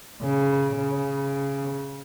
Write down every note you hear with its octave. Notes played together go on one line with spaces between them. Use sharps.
C#3
C#3